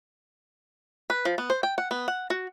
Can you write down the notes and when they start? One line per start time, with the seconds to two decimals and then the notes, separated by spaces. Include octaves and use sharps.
1.10 B4
1.25 F3
1.38 B3
1.50 C5
1.63 G5
1.78 F#5
1.91 B3
2.08 F#5
2.30 F#4